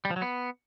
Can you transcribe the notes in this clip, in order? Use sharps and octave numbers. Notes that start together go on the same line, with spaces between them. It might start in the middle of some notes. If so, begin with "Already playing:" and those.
G3
F3
F#3
B3